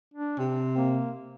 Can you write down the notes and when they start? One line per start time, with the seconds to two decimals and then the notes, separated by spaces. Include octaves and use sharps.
0.14 D4
0.39 C3 C4
0.77 A#3